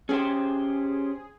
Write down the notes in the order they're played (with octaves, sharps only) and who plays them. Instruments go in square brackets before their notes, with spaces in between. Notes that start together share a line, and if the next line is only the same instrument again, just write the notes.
[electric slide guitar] C#4 G4 C5 [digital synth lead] G#4